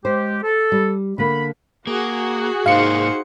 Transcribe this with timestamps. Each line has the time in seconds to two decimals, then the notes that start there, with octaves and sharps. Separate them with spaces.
0.05 G#3 G4 C5
0.43 A4
0.72 G3
1.18 D3 A#3 B5
1.87 A#3 F#4 G#4
2.66 G#2 A#3 D#4 C5 F5 C#7